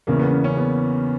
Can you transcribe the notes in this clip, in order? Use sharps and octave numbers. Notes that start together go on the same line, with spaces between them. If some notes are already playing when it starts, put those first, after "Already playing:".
E2 C#3 E3 A#3
B3
C#4
C#4
B3